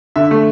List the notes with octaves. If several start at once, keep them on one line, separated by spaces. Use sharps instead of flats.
D3 E5
A3